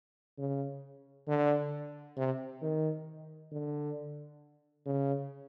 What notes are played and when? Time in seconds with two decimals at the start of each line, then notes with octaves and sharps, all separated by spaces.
0.38 C#3
1.28 D3
2.17 C3
2.62 D#3
3.51 D3
4.86 C#3